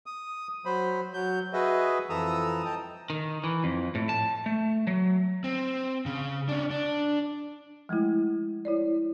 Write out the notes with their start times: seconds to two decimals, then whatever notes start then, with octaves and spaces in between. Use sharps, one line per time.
0.06 D#6
0.65 F#3 C5 B5
1.14 F#3 G6
1.53 F#4 G#4 B4 D#5 E5
2.09 F2 E3 A4 A#5 D#6 E6
2.65 D#5 G5 A5 A#5
3.10 D#3
3.44 E3
3.64 F2
3.95 A2
4.09 A5
4.46 A3
4.87 F#3
5.44 C4
6.06 C#3
6.49 C#4 D4
6.71 D4
7.89 F3 G#3 A3 E4
8.65 E4 C#5 D5